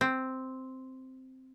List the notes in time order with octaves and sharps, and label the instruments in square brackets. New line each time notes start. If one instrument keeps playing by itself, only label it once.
[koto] C4